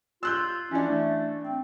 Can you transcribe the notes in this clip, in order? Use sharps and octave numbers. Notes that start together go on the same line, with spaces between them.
F4 E6 F#6 G6
E3 C#4 D4
A3
C4